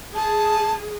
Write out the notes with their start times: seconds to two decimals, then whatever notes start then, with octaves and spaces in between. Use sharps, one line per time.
0.15 G#4 A5